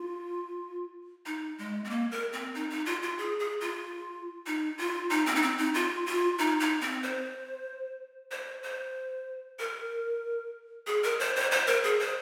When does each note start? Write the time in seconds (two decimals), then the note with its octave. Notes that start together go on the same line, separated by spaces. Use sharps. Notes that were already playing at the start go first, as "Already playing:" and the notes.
Already playing: F4
1.26 D#4
1.58 G#3
1.85 C4
1.90 A#3
2.11 A#4
2.33 C4
2.55 D#4
2.70 D#4
2.86 F4
3.02 F4
3.18 G#4
3.39 G#4
3.61 F4
4.46 D#4
4.78 F4
5.11 D#4
5.26 C4
5.35 D#4
5.42 C4
5.58 D#4
5.74 F4
6.06 F4
6.38 D#4
6.60 D#4
6.81 C4
7.03 C5
8.31 C5
8.63 C5
9.59 A#4
10.87 G#4
11.03 A#4
11.20 C5
11.36 C5
11.51 C5
11.67 A#4
11.84 G#4
11.99 C5